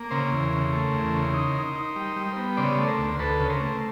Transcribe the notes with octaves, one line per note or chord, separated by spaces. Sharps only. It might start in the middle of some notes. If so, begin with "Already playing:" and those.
Already playing: A#3
C#3 A#4 C5
E2
C#3
A3
E2
C#3
D#4
D#4
D#4
G3
G3
B3
C#3 C5 D5
A3
A#4 C5
D2
D2 A4 B4
C#3
A#4 C5
A3